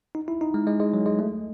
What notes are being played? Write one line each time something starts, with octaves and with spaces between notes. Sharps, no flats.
D#4
E4
D#4
G#3
G#3
G#3
F#3
G#3
A3